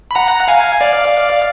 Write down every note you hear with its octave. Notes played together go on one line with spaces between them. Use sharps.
B5
F#5 A#5
F5 G#5
D5 F5